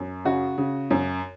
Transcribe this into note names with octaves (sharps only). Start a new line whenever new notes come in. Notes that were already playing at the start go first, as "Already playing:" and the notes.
Already playing: F#2
C#3 F#4
C#3
F#2